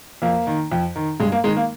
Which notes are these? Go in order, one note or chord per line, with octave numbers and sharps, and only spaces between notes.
F2 A#3
D#3
F2
D#3
G2 G#3
A#3
D#3 G#3
A#3